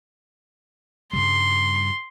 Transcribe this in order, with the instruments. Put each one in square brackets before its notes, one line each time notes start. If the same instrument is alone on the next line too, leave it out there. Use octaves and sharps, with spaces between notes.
[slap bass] G2 C#3 G3 [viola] C6